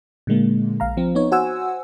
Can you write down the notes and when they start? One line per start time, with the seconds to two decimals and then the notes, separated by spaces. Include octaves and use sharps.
0.27 A#2 D3 G#3 A#3
0.80 A#1 F5 A#5
0.97 F3 C4
1.15 B3 D#4 C#5
1.32 F#4 C5 F#5 G#5 E6